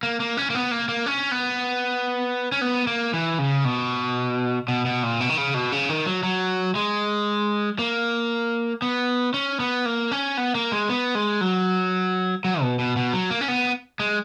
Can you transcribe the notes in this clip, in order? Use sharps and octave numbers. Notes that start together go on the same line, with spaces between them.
A#3
A#3
C#4
A#3
B3
A#3
A#3
C#4
B3
C#4
B3
A#3
E3
C#3
B2
B2
B2
A#2
B2
D#3
C#3
B2
C#3
D#3
F#3
F#3
G#3
A#3
B3
C#4
B3
A#3
C#4
B3
A#3
G#3
B3
G#3
F#3
F#3
B2
B2
B2
F#3
A#3
C#4
B3
G#3